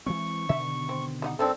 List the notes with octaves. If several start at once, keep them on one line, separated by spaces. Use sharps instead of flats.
E3 G#3 C4 C#6
B2 D3 D#3 E5
C4
G3 D#4 F#5
G2 D3 D#3 C4 D4 A4